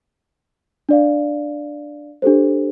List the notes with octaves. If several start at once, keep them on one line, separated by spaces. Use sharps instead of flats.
D4 D5 F5
D4 G4 A4 C5